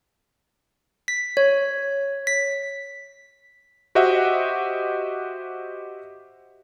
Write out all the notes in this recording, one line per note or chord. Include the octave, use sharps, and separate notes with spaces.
B6
C#5
B6
F#4 G4 C5 D#5 E5 F#5